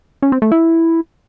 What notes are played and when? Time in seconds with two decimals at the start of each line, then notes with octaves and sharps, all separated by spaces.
0.22 C#4
0.32 C4
0.42 A3
0.52 E4